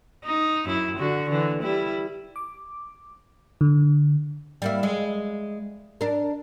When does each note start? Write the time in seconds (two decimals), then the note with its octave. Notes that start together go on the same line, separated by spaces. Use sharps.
0.24 D#4
0.65 F#2 E4
0.97 D3 F#4
1.29 D3 E3
1.62 G3 E4
2.36 D6
3.61 D3
4.62 G3 A#3 E4
4.83 G#3
6.01 D4 A#4